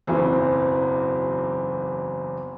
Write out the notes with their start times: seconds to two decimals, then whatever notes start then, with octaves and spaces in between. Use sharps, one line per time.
0.07 F#1 B1 E2 E3 C4